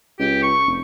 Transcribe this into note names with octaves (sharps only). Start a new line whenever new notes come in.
C#2 G4
C#6
F1